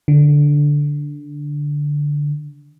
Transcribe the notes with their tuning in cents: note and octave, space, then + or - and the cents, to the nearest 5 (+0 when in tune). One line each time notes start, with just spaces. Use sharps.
D3 -5